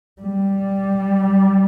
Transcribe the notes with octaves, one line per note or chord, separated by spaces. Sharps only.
G3